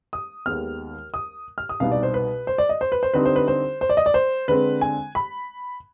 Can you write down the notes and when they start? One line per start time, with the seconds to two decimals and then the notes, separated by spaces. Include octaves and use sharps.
0.13 D#6
0.46 D#2 D#3 G#3 B3 F6
1.14 D#6
1.58 F6
1.69 D#6
1.80 C2 B2 B3 D#4 F5
1.92 D5
2.03 C5
2.14 B4
2.47 C5
2.58 D5
2.69 D#5
2.81 C5
2.92 B4
3.03 C5
3.14 D3 G3 C4 D#4 B4
3.26 C5
3.36 B4
3.48 C5
3.81 C5
3.89 D5
3.97 D#5
4.06 D5
4.14 C5
4.48 D3 G#3 C4 B4
4.81 G#5
5.15 B5